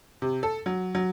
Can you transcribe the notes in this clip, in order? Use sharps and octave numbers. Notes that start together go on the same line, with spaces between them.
C3
A4
F#3
F#3